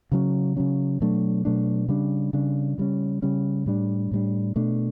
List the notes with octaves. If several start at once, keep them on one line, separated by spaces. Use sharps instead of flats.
C#3 F#3 C#4
C#3 F#3 C#4
B2 F#3 A3 D4
B2 F#3 A3 D4
C#3 G3 D4
C#3 G3 D4
C#3 G3 C#4
C#3 G3 C#4
A2 G3 D4
A2 G3 D4
B2 A3 D4